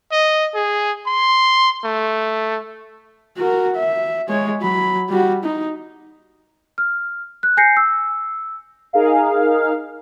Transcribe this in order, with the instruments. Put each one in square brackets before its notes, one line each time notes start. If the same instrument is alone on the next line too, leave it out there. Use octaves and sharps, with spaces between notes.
[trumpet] D#5
G#4
C6
A3
[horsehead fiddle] F#4 A#4
E5
G#3 C#5
F#3 B5
G3 F#4
D#4
[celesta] F6
F#6
G#5 G6 A#6 C7 C#7
E6
[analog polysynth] D#4 G#4 A#4 F5